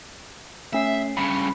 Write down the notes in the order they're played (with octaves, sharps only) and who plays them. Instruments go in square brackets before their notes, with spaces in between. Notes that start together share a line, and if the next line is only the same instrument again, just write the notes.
[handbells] A3 C#4 C7 [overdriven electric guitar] E5
[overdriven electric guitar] G2 C#3 [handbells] B5